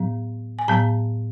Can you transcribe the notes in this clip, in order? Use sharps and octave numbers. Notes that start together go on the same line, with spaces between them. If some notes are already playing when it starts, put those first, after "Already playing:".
Already playing: A2 F#3 B3
G#5
A2 F#3 B3 A5